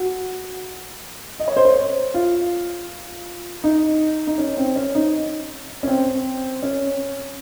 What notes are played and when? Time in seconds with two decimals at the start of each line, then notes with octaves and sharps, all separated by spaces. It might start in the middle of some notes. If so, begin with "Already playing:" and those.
Already playing: F#4
1.40 D#5
1.48 C#5
1.57 C5
1.65 C#5
2.14 F4
3.64 D#4
4.27 D#4
4.38 C#4
4.57 C4
4.76 C#4
4.95 D#4
5.83 C#4
5.88 C4
6.63 C#4